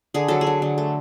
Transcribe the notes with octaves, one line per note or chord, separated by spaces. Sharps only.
D3 G#4
F#3 A4
G#4
F#3
D3
A3